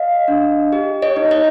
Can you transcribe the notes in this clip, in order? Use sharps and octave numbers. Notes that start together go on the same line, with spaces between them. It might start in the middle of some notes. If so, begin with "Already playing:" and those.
Already playing: D#5 F5
D4
G4
C#5 D#5
D#4
C#5 D#5